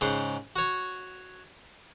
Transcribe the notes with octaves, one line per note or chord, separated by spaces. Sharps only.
G#2 C#3 C5 F#5
F#4 C#5